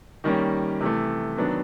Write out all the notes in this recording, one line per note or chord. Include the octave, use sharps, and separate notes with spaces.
D#3 G3 A#3 C#4
C3 E3 A3
D#3 F#3 B3 D4